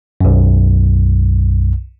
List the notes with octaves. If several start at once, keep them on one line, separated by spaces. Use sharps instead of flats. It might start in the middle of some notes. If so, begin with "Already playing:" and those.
B1 F#2